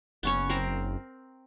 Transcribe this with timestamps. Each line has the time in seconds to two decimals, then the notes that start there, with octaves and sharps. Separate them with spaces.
0.23 F#1 B3 C#4 C#5
0.50 C4 A#4 A#5